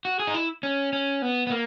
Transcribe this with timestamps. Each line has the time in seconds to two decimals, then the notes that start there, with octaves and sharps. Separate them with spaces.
0.05 F#4
0.20 G#4
0.27 D#4
0.34 E4
0.63 C#4
0.93 C#4
1.22 B3
1.47 B3
1.51 A#3